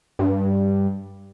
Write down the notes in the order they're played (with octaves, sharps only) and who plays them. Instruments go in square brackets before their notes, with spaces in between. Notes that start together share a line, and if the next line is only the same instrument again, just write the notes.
[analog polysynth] G2